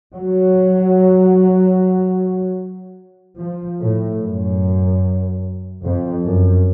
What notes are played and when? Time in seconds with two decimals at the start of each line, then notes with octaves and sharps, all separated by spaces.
0.14 F#3
3.39 F3
3.80 A2
4.20 F#2
5.83 F2
6.23 F#2